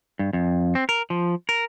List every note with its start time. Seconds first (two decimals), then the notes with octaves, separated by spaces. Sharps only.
0.19 G2
0.33 F2
0.75 C4
0.89 A#4
1.10 F3
1.49 A#4